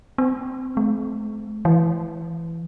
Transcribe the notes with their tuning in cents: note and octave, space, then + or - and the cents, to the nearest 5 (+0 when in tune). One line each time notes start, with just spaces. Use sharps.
C4 -25
A3 -45
E3 +10